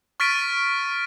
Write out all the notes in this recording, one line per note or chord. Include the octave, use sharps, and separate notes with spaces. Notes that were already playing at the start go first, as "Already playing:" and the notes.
C#6 F6 A6 B6 D7 D#7